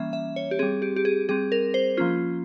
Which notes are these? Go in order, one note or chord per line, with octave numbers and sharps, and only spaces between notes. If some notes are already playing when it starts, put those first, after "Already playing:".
Already playing: E3 G3 A#3 C#4 E5
E5
C#5
G4
G3 C4 G#4
G4
G4
G#4
G3 C4 G#4
A#4
C5
F3 A#3 C#4 F4